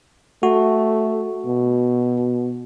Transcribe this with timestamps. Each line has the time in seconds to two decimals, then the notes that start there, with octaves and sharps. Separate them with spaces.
0.43 A3 F#4
1.46 B2